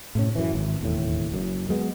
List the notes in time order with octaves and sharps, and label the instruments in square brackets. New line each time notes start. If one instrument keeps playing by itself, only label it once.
[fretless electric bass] A2 C3 C#4
F#2 E3
G#1
E1 D#2 A2
F#1 F#2
F#3 G#3 B3